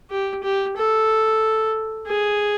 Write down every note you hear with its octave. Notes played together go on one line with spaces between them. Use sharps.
G4
G4
A4
G#4